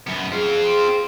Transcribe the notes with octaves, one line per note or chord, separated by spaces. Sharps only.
F#2 B3
C4 F4 G#4